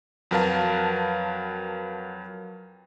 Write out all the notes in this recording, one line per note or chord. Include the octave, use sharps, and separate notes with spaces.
F2 F#3 A#4 B4 F5 A5